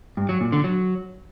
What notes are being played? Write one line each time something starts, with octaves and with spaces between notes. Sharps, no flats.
G2
F#3
A#2
D3
F#3